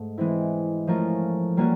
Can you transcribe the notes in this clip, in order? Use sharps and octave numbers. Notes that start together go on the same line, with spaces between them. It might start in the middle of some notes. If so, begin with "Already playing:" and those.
Already playing: G#2 A3
E3 G#3 C4 E4
F3 A3 C#4 F4 A#4
G3 A#3 C#4 F#4